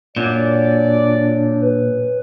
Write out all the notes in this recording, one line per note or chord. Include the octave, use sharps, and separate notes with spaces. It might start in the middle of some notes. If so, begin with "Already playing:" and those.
F#2 A#2 D4 D5
B4